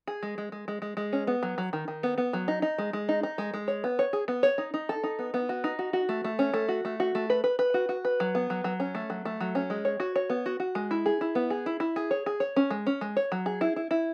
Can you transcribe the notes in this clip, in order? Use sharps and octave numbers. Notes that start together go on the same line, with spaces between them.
G#4
G#3
G#3
G#3
G#3
G#3
G#3
C#4
B3
F#3
F#3
D#3
D#3
B3
B3
F#3
D#4
D#4
G#3
G#3
D#4
D#4
G#3
G#3
C#5
B3
C#5
G#4
B3
C#5
D#4
D#4
A4
D#4
B3
B3
F#4
D#4
F#4
F#4
A3
A3
C#4
A3
F#4
A3
F#4
A3
B4
B4
B4
F#4
F#4
B4
F#3
B3
F#3
F#3
C#4
A3
F#3
A3
F#3
C#4
G#3
C#5
F#4
C#5
B3
F#4
F#4
G#3
E4
G#4
E4
B3
G#4
E4
E4
G#4
C#5
G#4
C#5
C#4
G#3
C#4
G#3
C#5
F#3
G#4
E4
E4
E4